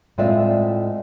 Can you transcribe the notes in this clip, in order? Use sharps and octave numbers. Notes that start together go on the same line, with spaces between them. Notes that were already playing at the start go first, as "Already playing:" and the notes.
A2 G#3 C4 F4 D5 E5